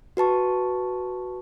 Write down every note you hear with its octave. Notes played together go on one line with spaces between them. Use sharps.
F#4 B4 A5 C#6